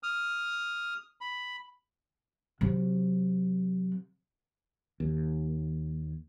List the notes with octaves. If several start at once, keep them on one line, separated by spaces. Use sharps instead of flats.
D#6 F6
B5
C3 F#3
D#2